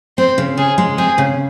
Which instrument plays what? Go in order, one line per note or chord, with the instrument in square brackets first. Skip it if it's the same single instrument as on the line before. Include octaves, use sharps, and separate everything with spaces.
[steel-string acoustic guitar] C4 [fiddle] C5
[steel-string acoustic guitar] C#3
[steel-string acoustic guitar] C#3 [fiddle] G#4
[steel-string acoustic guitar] G#3
[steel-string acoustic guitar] C4 [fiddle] G#4
[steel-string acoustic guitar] C#3